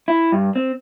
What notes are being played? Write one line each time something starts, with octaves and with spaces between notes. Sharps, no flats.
E4
G2
C4